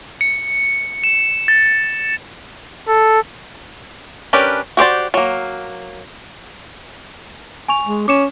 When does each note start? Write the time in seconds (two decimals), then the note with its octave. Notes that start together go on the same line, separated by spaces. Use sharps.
0.21 C#7
1.04 E7
1.48 A6
2.88 A4
4.33 C#4 D4 G4 A#4 B4
4.77 F#4 G4 C5 D5
5.14 F#3 A#3
7.68 G#5 C#6 F7
7.87 G#3
8.08 C#4 D6 C#7 E7